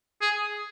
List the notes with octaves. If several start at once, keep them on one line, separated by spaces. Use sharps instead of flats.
G#4